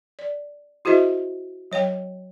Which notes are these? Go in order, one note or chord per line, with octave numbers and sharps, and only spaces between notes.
D5
E4 F#4 G#4 C5 D#5 E5
F#3 C#5 F5 G5